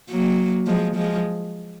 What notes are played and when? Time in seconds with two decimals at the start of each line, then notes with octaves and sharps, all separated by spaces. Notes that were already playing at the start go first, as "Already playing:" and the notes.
0.09 F#3 A#3
0.67 F3 G#3
0.96 F3 G#3